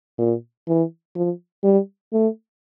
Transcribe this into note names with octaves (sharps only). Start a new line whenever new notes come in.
A#2
E3
F3
G3
A3